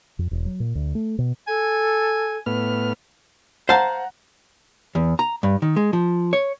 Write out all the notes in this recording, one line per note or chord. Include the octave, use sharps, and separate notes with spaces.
F2
E1
F#3
A#2
D2
A3
B2
A4 G#5
A2 B3 F6
C5 F5 F#5 A5 A#5
E2
A#5
G2
D#3
G#3
F3
C#5